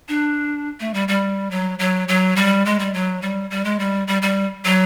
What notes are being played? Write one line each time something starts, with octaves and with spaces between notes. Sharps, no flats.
D4
A3
G3
G3
F#3
F#3
F#3
G3
G#3
G3
F#3
G3
G3
G#3
G3
G3
G3
F#3